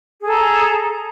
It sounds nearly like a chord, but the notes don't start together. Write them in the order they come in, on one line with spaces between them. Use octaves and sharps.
G#4 A4 A#5